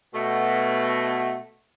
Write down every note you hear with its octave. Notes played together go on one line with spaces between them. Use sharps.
B2 A3